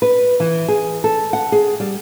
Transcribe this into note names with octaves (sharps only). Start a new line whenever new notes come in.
B4
E3
G#4
A4
F#5
G#4
G3